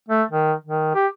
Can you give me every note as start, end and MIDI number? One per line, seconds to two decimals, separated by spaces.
0.08 0.23 57
0.31 0.52 51
0.64 0.91 51
0.94 1.07 67